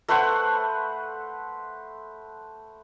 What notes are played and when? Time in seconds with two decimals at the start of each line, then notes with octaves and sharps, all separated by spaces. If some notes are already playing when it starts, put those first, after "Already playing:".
0.08 A3 B4 C5 F#5